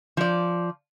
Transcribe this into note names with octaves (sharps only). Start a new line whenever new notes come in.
F3 D5